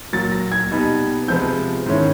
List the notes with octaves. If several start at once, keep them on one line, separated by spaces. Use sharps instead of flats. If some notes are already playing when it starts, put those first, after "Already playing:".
A#2 F#3 A#3 A6
A#6
G#6
B2 G3 B3 D#4
C3 F3 G#3 B3 G6
G#2 D#3 G#3 C#4 E4